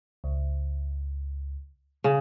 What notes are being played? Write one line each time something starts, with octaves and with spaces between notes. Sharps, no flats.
C#2
C#3